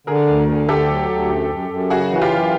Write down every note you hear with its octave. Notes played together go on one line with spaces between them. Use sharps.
D3 G#4 A#4
D2
D3
D2 G4 A4
F#3
D2
F#2
F#2
F#2
C#3 F#4 G#4
E3 F#4
F4 G4
F#2